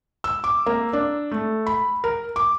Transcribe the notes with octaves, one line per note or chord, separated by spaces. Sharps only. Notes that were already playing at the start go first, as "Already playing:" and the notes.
E6
D6
A#3
D4
A3
B5
A#4
D6